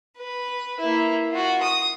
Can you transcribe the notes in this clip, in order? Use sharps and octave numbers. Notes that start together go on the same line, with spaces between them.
B4
A#3 E4
F4 F#4
D#6